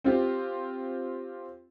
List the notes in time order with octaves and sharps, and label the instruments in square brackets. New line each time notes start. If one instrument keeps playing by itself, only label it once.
[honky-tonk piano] C4 F4 G4